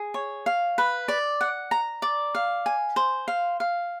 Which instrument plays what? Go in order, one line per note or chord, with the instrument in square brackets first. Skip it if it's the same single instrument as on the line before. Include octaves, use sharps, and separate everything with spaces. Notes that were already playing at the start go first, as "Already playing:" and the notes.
Already playing: [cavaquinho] G#4
C#5
F5
B4
D5
F#5
A#5
D5
F5
G#5
C5
F5
F5